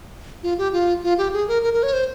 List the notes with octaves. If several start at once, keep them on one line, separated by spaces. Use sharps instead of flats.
F4
G4
F4
F4
G4
G#4
A#4
A#4
A#4
C#5
C5